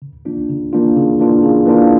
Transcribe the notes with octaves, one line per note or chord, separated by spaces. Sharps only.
C#3
E3 A#3 D4 F4
C#3
E3 A#3 D4 F4
C#3
E3 A#3 D4 F4
C#3
E3 A#3 D4 F4